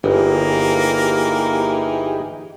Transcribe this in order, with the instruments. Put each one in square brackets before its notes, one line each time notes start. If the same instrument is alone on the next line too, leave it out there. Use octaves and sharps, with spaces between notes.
[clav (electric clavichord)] G1 [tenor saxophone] E3 [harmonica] A#3 [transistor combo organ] D#4 G4 G#4